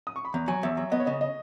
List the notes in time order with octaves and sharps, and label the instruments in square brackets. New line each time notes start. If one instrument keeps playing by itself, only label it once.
[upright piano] D#6
C#6
B5
[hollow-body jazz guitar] E2 [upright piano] A#5
[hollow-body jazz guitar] F#3 [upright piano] G#5
[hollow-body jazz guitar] E2 [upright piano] E5
[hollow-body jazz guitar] F#3
[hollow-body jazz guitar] B3 [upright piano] D#5
[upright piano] C#5
[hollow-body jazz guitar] C#3 [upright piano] D#5
[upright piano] D#5